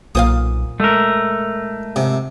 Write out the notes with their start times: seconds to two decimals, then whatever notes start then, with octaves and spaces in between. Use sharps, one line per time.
0.15 B1 A#2 C5 F5 D#6
0.80 G#3 A3 A#4
1.96 G#2 C3